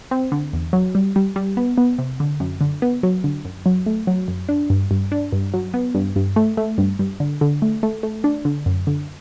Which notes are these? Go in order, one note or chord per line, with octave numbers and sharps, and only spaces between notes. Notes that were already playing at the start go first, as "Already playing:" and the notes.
C4
D3
E2
F#3
G3
G3
G3
B3
B3
C3
D3
F#2
D3
B3
F#3
D3
F#2
F#3
A3
F#3
F#2
D4
G2
G2
D4
G2
F#3
B3
G2
G2
A3
A3
G2
G2
D3
D3
A3
A3
A3
D4
D3
F#2
D3